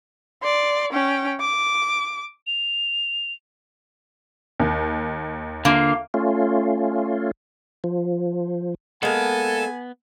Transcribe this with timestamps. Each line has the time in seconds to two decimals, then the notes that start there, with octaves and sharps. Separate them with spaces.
0.43 D5 C6
0.92 C#4 G5
1.40 D6
2.47 F7
4.60 D#2
5.65 D3 A#3 F4
6.14 A3 C#4 F4
7.84 F3
9.03 G#3 A#3 B3 A4 G#5